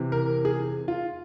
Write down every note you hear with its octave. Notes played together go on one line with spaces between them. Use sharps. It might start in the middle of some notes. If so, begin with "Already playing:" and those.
Already playing: C3 E3
A#4
G#4
F4